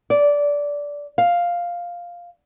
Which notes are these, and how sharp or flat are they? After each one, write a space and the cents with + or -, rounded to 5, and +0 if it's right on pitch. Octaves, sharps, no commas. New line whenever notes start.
D5 -15
F5 +0